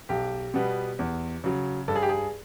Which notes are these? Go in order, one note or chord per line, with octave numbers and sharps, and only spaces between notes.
B1 G4
B2 G3 B3
E2
C#3 F#3
G2 A4
G#4
G4
G#4